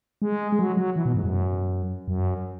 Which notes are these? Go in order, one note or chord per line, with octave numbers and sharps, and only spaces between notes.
G#3
G#3
F#3
F#3
E3
B2
G#2
F#2
F#2